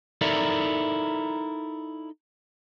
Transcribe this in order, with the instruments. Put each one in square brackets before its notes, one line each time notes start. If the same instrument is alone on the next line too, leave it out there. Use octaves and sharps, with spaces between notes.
[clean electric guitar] D#4 E4 A4 A#4 D5 E5